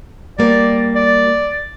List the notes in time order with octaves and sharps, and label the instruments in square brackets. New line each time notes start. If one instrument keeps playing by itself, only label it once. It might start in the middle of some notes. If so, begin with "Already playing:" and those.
[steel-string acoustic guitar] G3 A#3 [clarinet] D5
[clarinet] D5